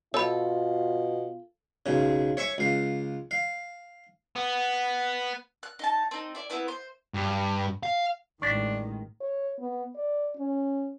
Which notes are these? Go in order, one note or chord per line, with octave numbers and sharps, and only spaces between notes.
B2 F4 A4 C#5 B5
B1 C#3
C#5 E5 G#5 C#6
C#2 F5
F5
B3
F#6
D#4 A5
C4 D#4
E4 D5
B3 C4 E4 B4
C5
G2
F5
A1 D#3 G#3 D4 C#6 A6 B6
C#5
B3
D5
C#4